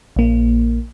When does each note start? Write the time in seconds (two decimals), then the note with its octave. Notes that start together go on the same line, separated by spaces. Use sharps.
0.16 A#1 A#3